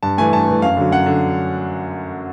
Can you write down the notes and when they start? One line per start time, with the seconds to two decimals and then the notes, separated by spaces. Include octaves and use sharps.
0.03 G2 A5
0.18 E3 A3 G#5
0.33 G2 A5
0.48 E3 A3
0.62 F#2 F5
0.77 D3 F#3
0.91 F#2 F#5
1.06 D3